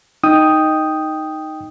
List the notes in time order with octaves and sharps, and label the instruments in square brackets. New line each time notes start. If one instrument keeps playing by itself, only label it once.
[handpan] D#4 [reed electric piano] G5 D#6